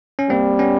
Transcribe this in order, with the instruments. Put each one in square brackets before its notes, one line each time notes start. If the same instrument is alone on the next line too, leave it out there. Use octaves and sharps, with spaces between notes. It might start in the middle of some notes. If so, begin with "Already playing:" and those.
[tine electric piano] C#4
[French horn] G3 [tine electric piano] A#3 C4
[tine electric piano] B3 C#4